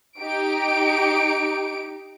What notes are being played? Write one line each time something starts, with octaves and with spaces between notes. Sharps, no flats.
D#4 G4 D7